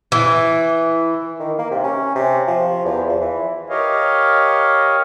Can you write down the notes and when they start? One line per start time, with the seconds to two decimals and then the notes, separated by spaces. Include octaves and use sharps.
0.12 E3
1.40 D#3
1.59 A#3
1.71 C3
1.83 C#4
2.15 C3
2.48 F3
2.85 E2
3.09 F3
3.21 E3
3.70 G4 A#4 C#5 D#5 F5